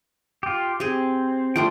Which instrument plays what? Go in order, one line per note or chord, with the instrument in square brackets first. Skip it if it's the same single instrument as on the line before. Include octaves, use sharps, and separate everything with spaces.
[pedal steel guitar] F4 G4
[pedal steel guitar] C4 [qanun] G4 G#4
[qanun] F3 A3 D4 [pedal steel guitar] G5 C6